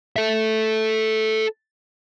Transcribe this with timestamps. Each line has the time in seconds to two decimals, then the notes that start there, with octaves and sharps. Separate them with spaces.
0.16 A4 E5